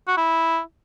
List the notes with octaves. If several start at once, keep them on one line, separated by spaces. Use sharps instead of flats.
F#4
E4